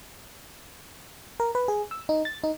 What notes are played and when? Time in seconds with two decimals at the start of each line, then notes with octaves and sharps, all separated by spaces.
1.40 A#4
1.55 B4
1.68 G#4
1.91 E6
2.09 D#4
2.25 A6
2.44 D#4